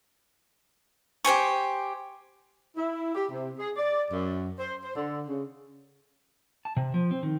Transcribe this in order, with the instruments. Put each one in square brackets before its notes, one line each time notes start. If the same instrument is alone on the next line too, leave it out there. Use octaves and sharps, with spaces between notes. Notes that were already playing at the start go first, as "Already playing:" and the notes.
[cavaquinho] G4 C5 G#5 C#6
[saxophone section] E4
G4
C3
G#4
D5
F#2
C5
C5
D3
C#3
[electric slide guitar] A5
C3
F3
C4
D#3